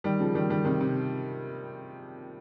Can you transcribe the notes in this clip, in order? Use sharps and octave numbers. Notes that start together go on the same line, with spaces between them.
D#3 G3
C#3 F3
D#3 G3
D#3 G3
C3 D#3
C3